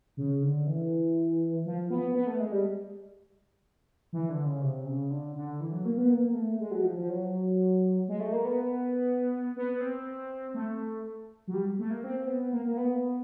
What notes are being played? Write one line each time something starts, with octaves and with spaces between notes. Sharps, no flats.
C#3
D3
E3
F3
B3
B3
A3
G#3
G3
E3
D3
C#3
C3
C#3
D3
D3
E3
F#3
A#3
B3
A#3
A3
G#3
F#3
F3
F3
F#3
G#3
A3
A#3
B3
B3
C4
A3
F#3
G3
A3
A#3
C4
B3
A#3
A#3
B3